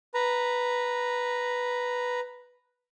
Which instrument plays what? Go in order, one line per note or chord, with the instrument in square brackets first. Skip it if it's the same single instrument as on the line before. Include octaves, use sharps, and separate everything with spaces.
[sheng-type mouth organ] B4 A#5